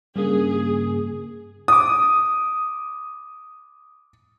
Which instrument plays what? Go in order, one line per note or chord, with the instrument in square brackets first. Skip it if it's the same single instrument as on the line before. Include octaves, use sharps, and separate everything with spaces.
[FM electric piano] G2 C#3 A#3 [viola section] G#4
[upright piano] D6 D#6